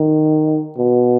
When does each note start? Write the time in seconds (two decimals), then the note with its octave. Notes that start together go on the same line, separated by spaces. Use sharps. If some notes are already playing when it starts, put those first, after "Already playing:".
Already playing: D#3
0.77 B2